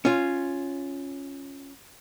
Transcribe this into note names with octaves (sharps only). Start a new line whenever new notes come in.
C#4 F4